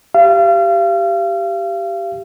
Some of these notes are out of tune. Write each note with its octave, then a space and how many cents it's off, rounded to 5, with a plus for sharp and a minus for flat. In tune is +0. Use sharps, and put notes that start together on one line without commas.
G4 -5 F5 -35